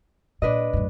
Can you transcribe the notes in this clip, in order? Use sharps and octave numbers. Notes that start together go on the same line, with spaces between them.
A#2 D4 B4 D#5
F#2 A2